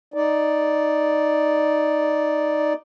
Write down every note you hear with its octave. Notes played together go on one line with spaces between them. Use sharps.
D#4 D5